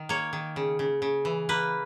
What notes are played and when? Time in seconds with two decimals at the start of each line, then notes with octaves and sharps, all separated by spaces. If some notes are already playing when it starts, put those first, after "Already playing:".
Already playing: D#3
0.09 A#3 C#5
0.33 D#3
0.56 C#3
0.79 C#3
1.02 C#3
1.25 E3
1.49 A#3 B4